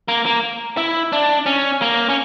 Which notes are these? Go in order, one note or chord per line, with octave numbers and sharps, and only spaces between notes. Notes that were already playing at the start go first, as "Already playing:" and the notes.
A#3
A#3
E4
D4
C#4
A#3
C#4